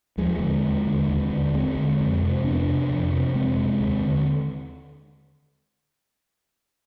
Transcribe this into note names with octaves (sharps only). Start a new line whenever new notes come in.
D#2 F3 G#3
D3
D#2
D3
D#2
D3
D#2 G#3 C4
D3
F2
C3
F2 B3 D4
C3
F2
C3
F2 G#3 C4
C3
D#2
D3